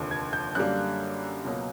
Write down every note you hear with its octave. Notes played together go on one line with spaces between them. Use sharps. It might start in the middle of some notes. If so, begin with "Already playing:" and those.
Already playing: F1 D#2 D3 F3
G#6
G6
F#2 D3 G3 A#3 F#6
C#2 B2 F#3 A#3